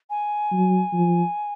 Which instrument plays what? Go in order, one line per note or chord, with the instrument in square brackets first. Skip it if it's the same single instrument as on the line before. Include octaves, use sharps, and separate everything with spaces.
[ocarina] G#5
[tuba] F#3
F3